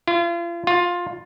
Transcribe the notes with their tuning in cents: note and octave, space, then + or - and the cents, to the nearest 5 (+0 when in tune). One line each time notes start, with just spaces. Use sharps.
F4 -40
F4 +10